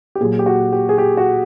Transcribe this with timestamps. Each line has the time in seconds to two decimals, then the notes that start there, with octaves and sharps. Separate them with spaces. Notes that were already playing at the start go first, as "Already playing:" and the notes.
0.15 G4
0.20 A#2 F#3 G#4
0.39 G4
0.46 F#4
0.72 G4
0.89 G#4
0.98 G4
1.17 F#4